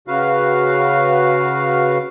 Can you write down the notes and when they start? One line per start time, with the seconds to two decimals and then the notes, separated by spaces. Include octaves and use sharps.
0.08 C#3 F#4 B4 F5